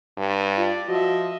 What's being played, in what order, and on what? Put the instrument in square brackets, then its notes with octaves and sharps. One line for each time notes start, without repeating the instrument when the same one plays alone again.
[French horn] G2
[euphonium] F4 [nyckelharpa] D5
[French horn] F3 [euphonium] F#4 [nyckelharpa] D#5 E5